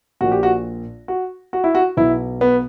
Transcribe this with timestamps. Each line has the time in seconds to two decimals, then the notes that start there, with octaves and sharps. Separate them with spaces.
0.21 A#1 A#2 F#4
0.32 G4
0.43 F#4
1.08 F#4
1.53 F#4
1.64 E4
1.75 F#4
1.97 B1 B2 E4
2.41 B3